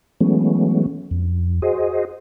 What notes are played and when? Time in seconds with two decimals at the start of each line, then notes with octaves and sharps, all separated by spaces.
0.21 E3 F#3 G#3 A3 B3 C#4
1.11 F2
1.62 F#4 G#4 C5 D#5